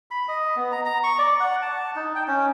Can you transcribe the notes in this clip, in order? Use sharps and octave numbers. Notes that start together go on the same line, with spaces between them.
B5
D#5
B3
A#5
A#5
C#6
D5
F#5
A5
D#4
G5
C#4